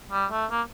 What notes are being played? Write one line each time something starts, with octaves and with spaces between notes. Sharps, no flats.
G3
A3
A#3